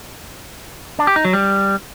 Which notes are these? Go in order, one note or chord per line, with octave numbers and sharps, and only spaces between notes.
D4
G4
D#4
F#3
G3